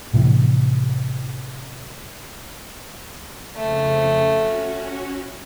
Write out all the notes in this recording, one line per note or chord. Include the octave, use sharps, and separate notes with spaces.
A2 C3 E3 F3
F2 C#3 A3
C#4 F#4